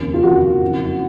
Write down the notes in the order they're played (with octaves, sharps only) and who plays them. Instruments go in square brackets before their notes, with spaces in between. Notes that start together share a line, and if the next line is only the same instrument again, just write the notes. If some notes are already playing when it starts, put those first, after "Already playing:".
Already playing: [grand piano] F1 D#2 C#3
[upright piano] F4
[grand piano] F1 D#2 C#3 [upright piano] F#4
[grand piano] F#1 F2 C#3